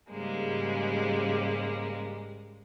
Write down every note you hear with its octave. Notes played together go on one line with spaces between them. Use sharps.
G#2 C#3 G3 G#3 A#3